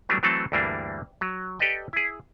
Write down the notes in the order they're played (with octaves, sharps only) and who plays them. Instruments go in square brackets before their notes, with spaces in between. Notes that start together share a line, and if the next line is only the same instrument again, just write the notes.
[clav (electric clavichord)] E3 F#3 G3 A3 B3 D4
E3 F#3 A3 C4 A4 A5
D2 G2 E3 G3 A#3 D4
F#3
G4 A4 B4 D5 D#5 G5
E4 G#4